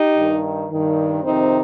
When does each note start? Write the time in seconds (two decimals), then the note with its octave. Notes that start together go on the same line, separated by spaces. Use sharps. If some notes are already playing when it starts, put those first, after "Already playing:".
Already playing: D#4 G4
0.17 G2 D#3
0.71 G2 D#3
1.24 F2 C3 D#3 C4 D#4